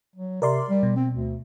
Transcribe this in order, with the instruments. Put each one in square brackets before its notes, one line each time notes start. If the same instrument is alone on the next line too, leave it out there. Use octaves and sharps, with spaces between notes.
[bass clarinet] F#3
[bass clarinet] C3 [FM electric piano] A#4 D5 C6
[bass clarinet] G3
[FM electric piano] B2
[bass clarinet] C4
D2